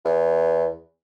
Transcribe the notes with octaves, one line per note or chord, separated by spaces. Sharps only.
E2